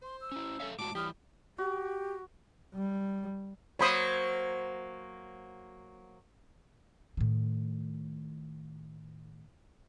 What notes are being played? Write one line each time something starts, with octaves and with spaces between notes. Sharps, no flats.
C5 C6
E6
C#4 E4
C#4 A4 E5 F5
A2 G#3 F#4 A5 D6
E3 G3 G4 B5 D#6 F6
F#4 G4
G3
F#3 A#3 C5 C#5 B5 D#6
A2 D#3